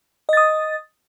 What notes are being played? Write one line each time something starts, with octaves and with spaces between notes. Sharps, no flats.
D#5 D#6 A6